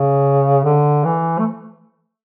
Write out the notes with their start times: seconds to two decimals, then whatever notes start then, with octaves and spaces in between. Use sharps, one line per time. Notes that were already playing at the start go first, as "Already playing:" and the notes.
Already playing: C#3
0.64 D3
1.04 E3
1.38 A3